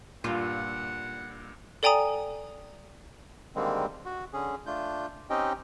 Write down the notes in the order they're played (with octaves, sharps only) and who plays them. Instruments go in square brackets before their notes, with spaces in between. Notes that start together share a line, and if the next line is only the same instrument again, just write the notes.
[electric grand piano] G2 A#2 [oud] F4 [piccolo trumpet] F#5
[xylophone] A4 D5 G5 G#5 A#5 D#6
[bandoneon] D3 D#3 G3 G#3 A#3 C4
F#4
D3 C#4 G#4
A3 D4 F4 G6
C4 C#4 D#4 G4 D#5 G5